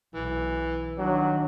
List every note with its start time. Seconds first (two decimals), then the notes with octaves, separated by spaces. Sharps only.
0.14 B1 E3
0.98 D#3 F#3 D4